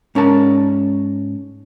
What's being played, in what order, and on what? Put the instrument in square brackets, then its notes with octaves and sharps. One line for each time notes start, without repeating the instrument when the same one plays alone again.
[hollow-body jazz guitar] G#2 C#4 A#4 A5